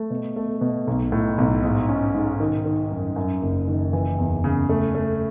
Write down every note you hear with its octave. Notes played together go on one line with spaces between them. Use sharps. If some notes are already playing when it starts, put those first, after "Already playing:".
Already playing: A3
B2
A3
B2
B1
A2
B1
G#2
C#4
G#2
D#3
D#3
F#2
F#2
F#1
D#3
E3
E2
C#3
A3
A3